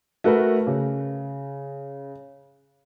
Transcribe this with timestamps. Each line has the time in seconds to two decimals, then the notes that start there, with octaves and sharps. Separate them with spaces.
0.24 A3 F#4 A#4 B4
0.67 C#3